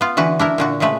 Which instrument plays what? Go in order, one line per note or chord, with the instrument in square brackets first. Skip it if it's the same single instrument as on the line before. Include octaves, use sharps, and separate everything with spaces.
[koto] B3 F4
D3 E3 F#4 B4
D4 E4 A#4
A#2 D3 F#4
A#2 C#3 G#3 A3 B4